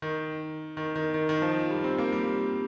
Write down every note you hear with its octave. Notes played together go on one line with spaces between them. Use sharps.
D#3
D#3
D#3
D#3
D#3
F3
G3
C4
A#3
G3